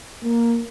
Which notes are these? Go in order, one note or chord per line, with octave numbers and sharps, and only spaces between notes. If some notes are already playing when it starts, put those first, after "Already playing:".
A#3